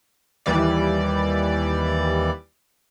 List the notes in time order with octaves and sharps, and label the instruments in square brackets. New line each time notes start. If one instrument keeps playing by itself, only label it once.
[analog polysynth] D#2 E3 G3 D5